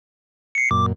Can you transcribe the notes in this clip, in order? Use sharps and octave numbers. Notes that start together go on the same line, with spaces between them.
C7 C#7
F#2 A#2 D6